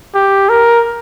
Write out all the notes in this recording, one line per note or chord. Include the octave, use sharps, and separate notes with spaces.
G4
A#4